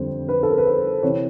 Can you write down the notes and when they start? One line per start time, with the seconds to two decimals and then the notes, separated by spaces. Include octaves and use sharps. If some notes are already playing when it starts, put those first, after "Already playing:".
Already playing: F2 D3 G3 C5
0.29 B4
0.43 A4
0.50 A#4
0.58 B4
0.66 C5
1.02 C3 E3 C#5